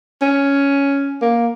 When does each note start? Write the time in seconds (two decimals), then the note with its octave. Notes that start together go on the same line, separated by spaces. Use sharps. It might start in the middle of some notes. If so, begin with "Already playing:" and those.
0.21 C#4
1.22 A#3